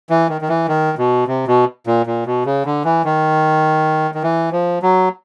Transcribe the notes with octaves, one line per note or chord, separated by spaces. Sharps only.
E3
D#3
D#3
E3
D#3
B2
C3
B2
A#2
A#2
B2
C#3
D3
E3
D#3
D#3
E3
F3
F#3